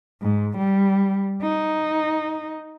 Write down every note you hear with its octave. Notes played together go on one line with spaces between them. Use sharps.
G#2
G3
D#4